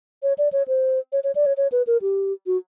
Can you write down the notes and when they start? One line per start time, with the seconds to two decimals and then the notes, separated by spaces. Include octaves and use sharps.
0.23 C#5
0.38 D5
0.52 C#5
0.68 C5
1.12 C#5
1.24 C#5
1.35 D5
1.46 C#5
1.57 C#5
1.72 B4
1.87 A#4
2.02 G4
2.46 F#4